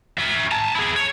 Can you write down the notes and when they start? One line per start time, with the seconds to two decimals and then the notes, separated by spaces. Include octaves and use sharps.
0.18 F#4 E5
0.52 A5 A#5
0.75 E4 G#4
0.96 C#5